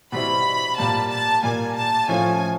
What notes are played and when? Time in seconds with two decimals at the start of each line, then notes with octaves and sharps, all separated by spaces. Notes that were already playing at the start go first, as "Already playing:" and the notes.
0.12 B2 G3 C4 E4 B5
0.77 A#2 G3 A#3 A5
1.10 A5
1.43 A#2 G3 A#3 G#5
1.76 A5
2.08 A2 F3 A3 C#4 F4 G#5